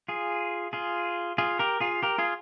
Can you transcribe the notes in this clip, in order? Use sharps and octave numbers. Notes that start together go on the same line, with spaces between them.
F4 G#4
F4 G#4
F4 G#4
G4 A#4
F4 G#4
G4 A#4
F4 G#4